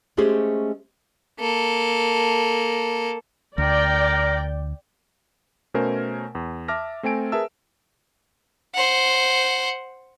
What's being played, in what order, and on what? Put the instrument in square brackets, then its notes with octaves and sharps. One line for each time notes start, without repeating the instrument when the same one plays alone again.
[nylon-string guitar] G#3 A3 C#4 G4 G#4 C5
[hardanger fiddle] A#3 A4
[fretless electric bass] D2 [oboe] A#4 [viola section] D5 G5
[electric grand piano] B2 A3 C#4 A#4 C5 G#5
E2
E5 A5 D6 F6 A#6
A3 C4 A4 G#5 D7
G#4 A#4 B4 E5 A5 E6
[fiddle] C5 F#5